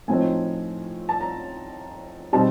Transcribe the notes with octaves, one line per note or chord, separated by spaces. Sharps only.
A2 F3 A3 C4 D#4 G#5
A5
A#5
B2 G3 C4 D#4 A5